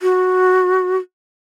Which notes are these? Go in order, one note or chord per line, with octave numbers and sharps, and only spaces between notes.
F#4